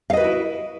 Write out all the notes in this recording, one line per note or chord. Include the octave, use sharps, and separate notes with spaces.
E4 F#4 B4 D#5 F5